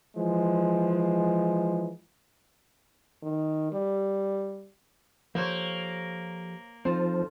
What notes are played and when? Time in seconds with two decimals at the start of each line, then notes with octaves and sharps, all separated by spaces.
0.17 E3 F3 G#3
3.23 D#3
3.73 G3
5.35 F3 A#3 G4 A4 A#4 C5 C#5
6.85 F3 C4 D#4 F4 A4 C5